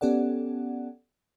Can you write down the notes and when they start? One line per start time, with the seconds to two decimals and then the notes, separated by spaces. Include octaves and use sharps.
0.01 B3 C#4 G4 A4 D5 F#5